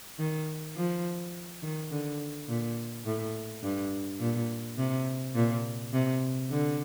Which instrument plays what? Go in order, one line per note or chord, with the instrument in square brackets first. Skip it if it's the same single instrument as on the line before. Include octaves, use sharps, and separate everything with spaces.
[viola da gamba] D#3
F3
D#3
D3
A#2
A2
G2
A#2
C3
A#2
C3
D3